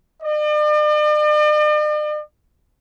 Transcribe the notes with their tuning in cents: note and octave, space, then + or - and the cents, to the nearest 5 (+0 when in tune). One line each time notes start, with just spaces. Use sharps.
D5 +45